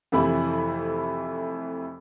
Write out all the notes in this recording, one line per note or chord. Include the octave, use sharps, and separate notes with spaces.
F2 C3 E3 A3 E4 B5